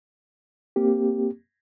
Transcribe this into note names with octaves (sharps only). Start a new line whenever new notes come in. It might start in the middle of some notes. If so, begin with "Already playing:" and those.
A#3 C4 G4